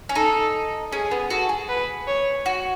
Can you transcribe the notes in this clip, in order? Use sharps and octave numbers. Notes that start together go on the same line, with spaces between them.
C#4
D#4 A4
C#4 G#4
B3
F#4 A4
G#4
B4
C#5
F#4